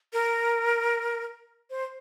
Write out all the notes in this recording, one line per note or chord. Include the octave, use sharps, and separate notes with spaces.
A#4
C5